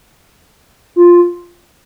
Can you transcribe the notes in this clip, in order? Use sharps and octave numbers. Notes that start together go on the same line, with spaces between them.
F4